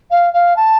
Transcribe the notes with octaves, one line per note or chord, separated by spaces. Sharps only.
F5
F5
A5